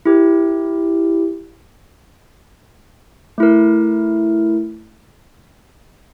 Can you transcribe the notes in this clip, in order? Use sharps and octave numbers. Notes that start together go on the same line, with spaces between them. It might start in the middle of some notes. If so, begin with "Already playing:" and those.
E4 G4 A#4
A3 E4 A#4